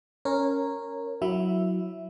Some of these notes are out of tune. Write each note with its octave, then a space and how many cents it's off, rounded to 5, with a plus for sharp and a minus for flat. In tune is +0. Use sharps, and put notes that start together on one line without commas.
C#4 +0 A#4 -5 C#5 -20
F#3 -5 E4 +0 E5 +0